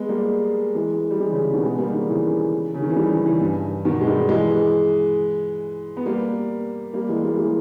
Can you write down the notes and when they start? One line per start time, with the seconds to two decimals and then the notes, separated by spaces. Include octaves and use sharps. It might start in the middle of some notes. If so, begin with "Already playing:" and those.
Already playing: G#3 B3
0.09 G3 A#3
0.75 E3 G#3
1.11 G3
1.20 E3 G#3
1.31 C#3 E3
1.42 C#3 E3
1.53 B2 D#3
1.63 G#3 B3
1.74 B3
1.78 G3 A#3
1.94 D#3 G3
2.08 C#3 E3
2.74 C#3
2.82 D#3
2.89 E3
2.96 D#3 G3
3.11 D#3 G3
3.26 C#3 E3
3.41 G2
3.85 B2 D#3
4.01 G#3
4.07 D#3 G3
4.29 E3 G#3
5.97 B3
6.06 G3 A#3
6.94 G3 A#3
7.09 E3 G#3
7.24 G3 A#3
7.38 E3 G#3